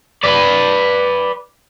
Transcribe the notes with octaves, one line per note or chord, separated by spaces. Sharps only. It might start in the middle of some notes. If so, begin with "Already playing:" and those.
B4 D5